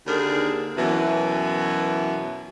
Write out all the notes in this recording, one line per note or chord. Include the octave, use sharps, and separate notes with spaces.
D#2 D3 G#4 A#4
F#2 B2 E3